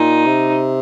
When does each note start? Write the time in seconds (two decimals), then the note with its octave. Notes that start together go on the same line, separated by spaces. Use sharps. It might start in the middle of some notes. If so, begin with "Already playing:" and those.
Already playing: A#2 D#4
0.26 C3